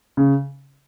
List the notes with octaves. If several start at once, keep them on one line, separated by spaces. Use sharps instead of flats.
C#3